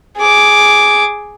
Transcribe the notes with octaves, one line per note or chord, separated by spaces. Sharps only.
G#4 D6